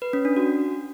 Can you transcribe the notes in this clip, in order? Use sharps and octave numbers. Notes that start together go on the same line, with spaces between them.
B4
C#4
D4
F#4